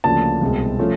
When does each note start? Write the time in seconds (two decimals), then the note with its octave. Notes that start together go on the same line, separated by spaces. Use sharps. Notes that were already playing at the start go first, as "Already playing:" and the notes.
0.04 D2 C#3 F3 A#3 D4 A5
0.41 C2 B2 G#3 C4
0.79 F3 A3 C#4